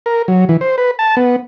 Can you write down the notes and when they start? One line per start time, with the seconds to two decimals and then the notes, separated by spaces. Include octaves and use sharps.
0.06 A#4
0.28 F#3
0.49 E3
0.61 C5
0.78 B4
0.99 A5
1.17 B3